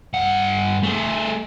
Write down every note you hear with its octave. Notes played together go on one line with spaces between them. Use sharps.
G2 F#5
A3 G#4